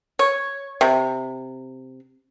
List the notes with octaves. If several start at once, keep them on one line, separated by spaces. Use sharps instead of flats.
C#5
C3